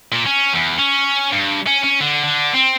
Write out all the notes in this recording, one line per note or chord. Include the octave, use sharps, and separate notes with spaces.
A#2
C#4
E2
C#4
G2
C#4
C#4
D3
D3
C4